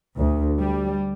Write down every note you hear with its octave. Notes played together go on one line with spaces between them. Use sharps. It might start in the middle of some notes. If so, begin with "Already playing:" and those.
D2
G3